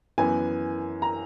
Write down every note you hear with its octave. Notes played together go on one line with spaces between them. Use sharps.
F#2 E3 B3 G#5
A#5